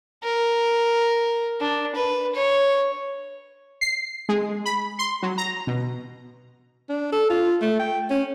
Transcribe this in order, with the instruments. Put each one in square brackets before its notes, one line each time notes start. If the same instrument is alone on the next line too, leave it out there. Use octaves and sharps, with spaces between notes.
[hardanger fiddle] A#4
D4
B4
C#5
[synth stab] C7
G#3
B5
C6
F#3
A#5
B2
[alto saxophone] D4
A4
F4
A3
G5
C#4